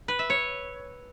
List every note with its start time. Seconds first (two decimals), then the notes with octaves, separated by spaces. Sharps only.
0.08 B4
0.19 E5
0.30 C#5